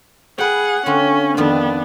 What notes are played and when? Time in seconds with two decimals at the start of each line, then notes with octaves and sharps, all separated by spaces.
0.38 G#4 B4 F#5 G5
0.86 D3 C4 C#4 F4
1.37 F2 D#3 B3 D4 F4